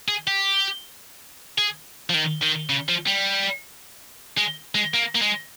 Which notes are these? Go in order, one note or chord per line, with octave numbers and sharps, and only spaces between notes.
G#4
G4
G#4
F3
D#3
D#3
C#3
F3
G3
G#3
G#3
A#3
A#3
G#3